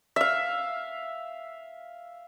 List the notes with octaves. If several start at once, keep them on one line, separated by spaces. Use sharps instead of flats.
E5 F5